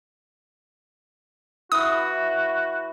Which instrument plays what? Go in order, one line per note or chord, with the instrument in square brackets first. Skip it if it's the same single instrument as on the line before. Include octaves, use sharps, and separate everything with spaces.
[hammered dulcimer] E3 E4 [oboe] F#4 [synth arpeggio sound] D#6